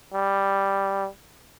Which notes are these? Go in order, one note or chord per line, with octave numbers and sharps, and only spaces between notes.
G3